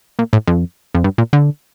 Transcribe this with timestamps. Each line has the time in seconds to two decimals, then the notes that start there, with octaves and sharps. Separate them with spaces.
0.19 A#2
0.33 A2
0.47 F2
0.95 F2
1.04 G2
1.18 A#2
1.33 D3